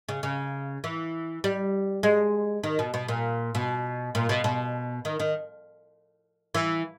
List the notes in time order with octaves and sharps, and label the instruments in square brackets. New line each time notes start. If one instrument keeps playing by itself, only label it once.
[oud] C#3
C#3
E3
G3
G#3
D#3
B2
B2
A#2
B2
A#2
B2
B2
D#3
D#3
E3